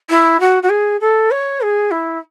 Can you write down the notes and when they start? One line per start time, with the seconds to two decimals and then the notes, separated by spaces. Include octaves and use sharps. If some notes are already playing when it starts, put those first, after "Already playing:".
0.10 E4
0.40 F#4
0.63 F#4
0.69 G#4
1.00 A4
1.31 C#5
1.61 G#4
1.91 E4